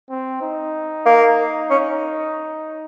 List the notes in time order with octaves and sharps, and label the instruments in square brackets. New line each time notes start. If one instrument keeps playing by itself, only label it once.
[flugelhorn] C4
D#4
[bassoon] A#3
C#4